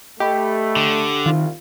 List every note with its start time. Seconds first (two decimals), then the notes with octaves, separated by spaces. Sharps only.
0.20 A3 G4 D#5 B5
0.76 D3
1.26 C2 D#3 F4